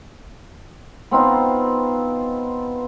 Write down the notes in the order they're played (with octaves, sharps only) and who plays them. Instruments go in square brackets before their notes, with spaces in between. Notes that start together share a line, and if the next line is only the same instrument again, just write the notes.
[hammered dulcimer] B3 C4 D#4 F4